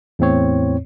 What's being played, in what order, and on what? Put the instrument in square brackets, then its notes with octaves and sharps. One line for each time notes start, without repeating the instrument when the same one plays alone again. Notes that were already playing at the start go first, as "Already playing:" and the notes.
[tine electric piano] E2 A2 C4 C#5